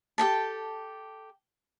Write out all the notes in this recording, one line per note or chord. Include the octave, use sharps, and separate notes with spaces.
G4 A4 G5 A5